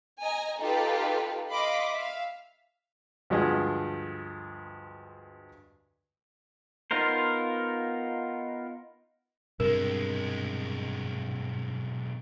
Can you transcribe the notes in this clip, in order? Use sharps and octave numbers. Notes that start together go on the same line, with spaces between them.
D#5 G#5 A#5
D#4 F4 G4 A4 B4
D#5 F5 B5 C6 D6
E5 F5
D2 G2 F3 G#3
B3 D#4 F4 A#4 C5
B1 G2 C3 G#3 A#4